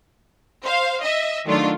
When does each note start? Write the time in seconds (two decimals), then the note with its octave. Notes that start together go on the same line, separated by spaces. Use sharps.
0.63 C5 F5
1.01 D#5 E5
1.46 D#3 F#3 A3 D4 F4